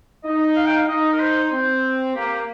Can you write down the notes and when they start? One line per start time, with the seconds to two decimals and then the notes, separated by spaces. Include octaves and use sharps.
0.24 D#4 D#5
0.56 F5
0.66 G5
0.76 F5
0.88 D#4 D#5
1.13 A#4
1.20 C5
1.52 C4 C5
2.15 A#3 G4